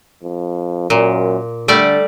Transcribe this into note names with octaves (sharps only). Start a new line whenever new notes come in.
F2
F#2 A#2
D3 G3 A3 D5